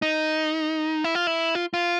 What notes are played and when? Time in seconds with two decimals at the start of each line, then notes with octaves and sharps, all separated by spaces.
0.02 D#4
1.04 E4
1.15 F4
1.27 E4
1.55 F4
1.74 F4